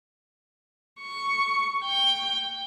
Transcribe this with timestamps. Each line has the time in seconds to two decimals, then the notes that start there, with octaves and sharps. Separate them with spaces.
1.01 C#6
1.85 G5